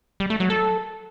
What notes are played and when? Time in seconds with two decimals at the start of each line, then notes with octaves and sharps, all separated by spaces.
0.20 G3
0.30 A3
0.40 F#3
0.50 A4